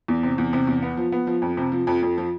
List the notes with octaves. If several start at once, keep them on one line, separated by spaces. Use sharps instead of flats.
E2
C3
E2
C3
E2
B3
F3
B3
F3
F2
C3
F3
F2
F2
F3